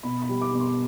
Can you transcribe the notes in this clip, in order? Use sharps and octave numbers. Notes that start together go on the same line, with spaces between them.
B2 B5
B5
G3
D6
B2
C6